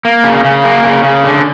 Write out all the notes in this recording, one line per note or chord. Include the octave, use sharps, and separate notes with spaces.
A#3
C#3
C#3
A#3
C#3
C#3
D3